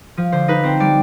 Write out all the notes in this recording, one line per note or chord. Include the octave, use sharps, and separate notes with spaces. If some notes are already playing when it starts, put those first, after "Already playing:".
F3
D3 C5
D#4 B4
C4 C5
G3 D5